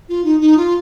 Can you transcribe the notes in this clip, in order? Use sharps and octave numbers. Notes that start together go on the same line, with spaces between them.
F4
D#4
D#4
F4